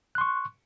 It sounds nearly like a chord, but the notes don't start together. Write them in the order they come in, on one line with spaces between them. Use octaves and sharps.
F#6 C6 C#6